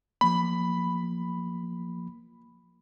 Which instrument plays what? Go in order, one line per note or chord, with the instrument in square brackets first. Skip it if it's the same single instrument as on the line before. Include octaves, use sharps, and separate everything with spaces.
[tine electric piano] F3 A#3 [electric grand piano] B5